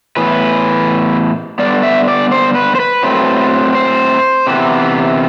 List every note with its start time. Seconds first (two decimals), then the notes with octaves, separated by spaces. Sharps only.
0.17 A2 E3 B3 B4
1.59 D3 G3 B3 D5
1.83 E5
2.08 D5
2.32 C5
2.55 B4
2.75 C5
2.80 B4
3.03 A2 F#3 A3 C4
3.75 C5
4.47 C3 E3 B3